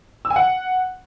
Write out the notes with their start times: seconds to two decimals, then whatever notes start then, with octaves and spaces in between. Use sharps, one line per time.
0.25 E6
0.30 G#5
0.36 F#5